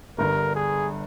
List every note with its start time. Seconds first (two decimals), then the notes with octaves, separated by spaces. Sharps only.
0.18 G1 G2 D3 A#4
0.55 G#4